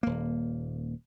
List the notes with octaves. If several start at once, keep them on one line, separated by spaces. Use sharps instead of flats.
D#1 A#3